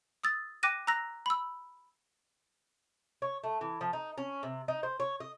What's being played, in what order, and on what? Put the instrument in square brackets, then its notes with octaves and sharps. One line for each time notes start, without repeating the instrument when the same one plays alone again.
[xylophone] D#6 E6 A6
G5 D6 F#6 A#6 D#7
A#5 E6 F#6 A#6
B5 E6
[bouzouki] C#5
A3
E3
F3
D#4
C#4
C3
D#4
C5
C#5
D#5